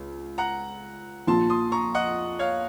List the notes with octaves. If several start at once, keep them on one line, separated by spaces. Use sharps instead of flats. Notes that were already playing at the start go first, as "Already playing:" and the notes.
Already playing: C#2
F#5 A#5
A#1 A#2 F3 A5 C6
C6 D#6
A#5 C#6
D#5 F#5
C#5 F5